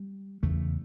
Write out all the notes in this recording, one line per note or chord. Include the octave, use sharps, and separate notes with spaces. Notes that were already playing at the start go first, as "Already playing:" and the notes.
Already playing: G3
E2 C#3 A3